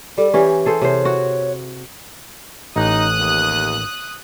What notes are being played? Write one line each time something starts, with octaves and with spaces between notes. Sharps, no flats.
G3 A4
E3 C#4 G4
G#4 A4 C5
C3 C5 C#5
F#4
A1 D#4 D#6 F#6
D#2